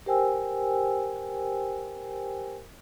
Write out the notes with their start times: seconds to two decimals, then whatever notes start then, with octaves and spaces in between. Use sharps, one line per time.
0.06 G4 A#4 C5 G5 G#5 E6